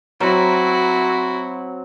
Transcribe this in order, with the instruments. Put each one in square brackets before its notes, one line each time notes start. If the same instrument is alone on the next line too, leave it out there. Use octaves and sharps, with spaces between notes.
[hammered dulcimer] F#3 C4 [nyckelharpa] E4 F#4